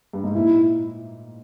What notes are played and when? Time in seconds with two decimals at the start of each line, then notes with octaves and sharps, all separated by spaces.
0.13 G2
0.24 G#2
0.35 A#2 E4